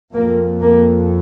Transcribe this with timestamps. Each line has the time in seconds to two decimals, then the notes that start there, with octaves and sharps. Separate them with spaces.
0.14 F2 A#3
0.61 A#3